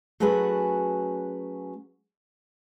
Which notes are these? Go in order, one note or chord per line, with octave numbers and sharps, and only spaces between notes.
F#3 A3 C#4 F#4 G#4 B4